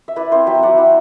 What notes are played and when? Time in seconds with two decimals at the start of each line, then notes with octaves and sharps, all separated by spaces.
0.08 E5
0.16 E4 B4 D5
0.32 C4 C5 E5
0.47 F#3 E5 G5
0.63 F#3 D5 F#5
0.78 E4